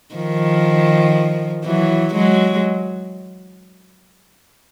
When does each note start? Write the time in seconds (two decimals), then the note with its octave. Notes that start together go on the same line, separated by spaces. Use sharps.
0.15 D#3 F3
1.64 E3 F#3
2.14 F#3 G#3